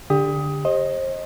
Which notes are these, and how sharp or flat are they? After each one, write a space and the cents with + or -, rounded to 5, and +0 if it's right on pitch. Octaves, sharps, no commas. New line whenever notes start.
D3 +0 G4 +25 D#6 +20
C5 +35 D#5 +0